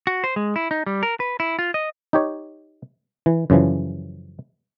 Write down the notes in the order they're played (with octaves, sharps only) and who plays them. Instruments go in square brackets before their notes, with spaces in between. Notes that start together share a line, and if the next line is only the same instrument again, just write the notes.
[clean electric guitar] F#4
C5
G#3
E4
D#4
G3
A#4
B4
E4
F4
D#5
[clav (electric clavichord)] D#4 G4 C#5
E3
F#2 C#3 E3 F3